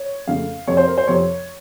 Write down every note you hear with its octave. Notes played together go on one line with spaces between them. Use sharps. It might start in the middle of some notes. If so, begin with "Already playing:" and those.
Already playing: C#5
F2 C#3 A3 F5
F2 C3 F3 C4 C#5
C5
A#4
C5
F2 C3 F3 C4 C#5